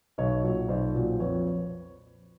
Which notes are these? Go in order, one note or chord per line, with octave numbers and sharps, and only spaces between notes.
B1 C#5 D#5
A#2 F#3
B1 C5 D5
A#2 F#3
F2 B4 C#5